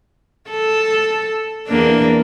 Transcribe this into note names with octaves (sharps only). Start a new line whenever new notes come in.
A4
E2 A#3 D4